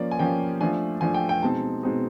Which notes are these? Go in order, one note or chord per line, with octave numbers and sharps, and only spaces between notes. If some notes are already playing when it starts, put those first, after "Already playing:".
Already playing: F3 A#3 C#4 D5
G#5
F3 A#3 C#4 G5
F3 A3 D4 G#5
F3 A3 D4 G#5
G5
G5
B2 G#3 C4 D#4 A5
B2 G#3 C4 D#4